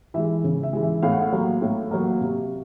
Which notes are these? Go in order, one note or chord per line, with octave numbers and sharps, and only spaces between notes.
E3 G#3 E5
C#3
E5
E3 G#3
E5
A2 F5
F#5
F5
F#3 A#3
A2
F#3 A#3
C3